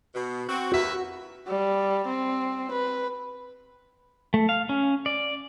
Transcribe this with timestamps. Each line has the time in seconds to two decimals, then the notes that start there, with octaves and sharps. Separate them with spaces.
0.14 B2
0.47 C4 F#4
0.72 D#2 F#4 B4 E5
1.47 G3
2.08 C4
2.72 B4
4.34 A3
4.49 F5
4.69 C#4
5.06 D5